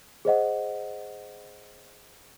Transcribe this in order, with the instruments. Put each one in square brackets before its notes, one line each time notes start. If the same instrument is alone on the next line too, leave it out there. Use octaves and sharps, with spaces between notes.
[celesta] G#4 C5 D#5 F#5